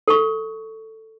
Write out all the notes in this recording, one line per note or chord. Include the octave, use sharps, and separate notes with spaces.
A4 C#6